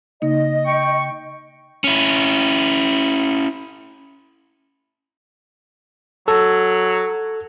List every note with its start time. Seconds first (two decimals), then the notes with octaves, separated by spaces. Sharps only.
0.22 C#3 A#3 D#4 D#5
0.66 G5 C#6
1.84 C#4 E4
6.28 F#3 A4